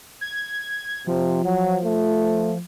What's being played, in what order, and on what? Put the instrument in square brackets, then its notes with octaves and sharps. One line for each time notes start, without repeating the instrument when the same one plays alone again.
[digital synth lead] G#6
[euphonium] C3 [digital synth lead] F3
[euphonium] F#3
A3